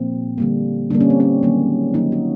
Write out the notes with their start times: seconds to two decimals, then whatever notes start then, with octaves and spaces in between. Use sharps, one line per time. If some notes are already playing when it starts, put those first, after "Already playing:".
Already playing: A#2 F3 A#3 C4
0.38 D3 G3 A#3
0.90 D3 G3 A#3 D4
1.01 C#4
1.10 C4
1.20 C#4
1.43 D#3 F#3 A#3
1.94 D#3 F#3 A#3 D#4
2.12 F#4